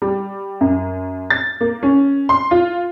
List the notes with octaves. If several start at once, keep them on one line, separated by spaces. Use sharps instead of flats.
G3
F#2
A6
A#3
C#4
C6
F4